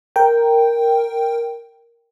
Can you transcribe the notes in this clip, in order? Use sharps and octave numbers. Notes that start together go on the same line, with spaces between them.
A#4 G5